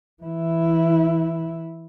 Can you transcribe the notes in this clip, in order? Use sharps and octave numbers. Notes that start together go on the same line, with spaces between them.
E3 E4